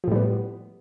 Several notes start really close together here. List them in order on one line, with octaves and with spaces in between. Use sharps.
F3 A2 G3 B3